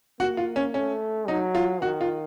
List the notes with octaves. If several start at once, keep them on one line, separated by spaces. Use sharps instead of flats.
A#3 F#4
F4
C#4
A3 C#4
F#3 D#4
F4
D#3 F#4
F4